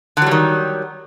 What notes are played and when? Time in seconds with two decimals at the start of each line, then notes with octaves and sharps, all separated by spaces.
0.17 D3
0.22 F#3
0.27 G3
0.31 D#3